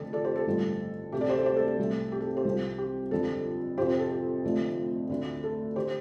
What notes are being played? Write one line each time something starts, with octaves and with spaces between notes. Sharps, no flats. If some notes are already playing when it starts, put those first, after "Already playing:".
Already playing: F1 F2 D3 A4
A4 D5
G4 C5
A4
A1 G2 D3 F3
D2 C3 A3 G4
A4 D5
G4 C5
A4
G4 C5
A4
A4
C2 C3 A3
G4
A4
G4 C5
C2 C3 F3
G4
G1 F2 D3 G3 A4
F2 C3 F3 G4 C5
A4
G4
F1 F2 D3 F3 A3
D2 D3 A3
A4
D3 G4 C5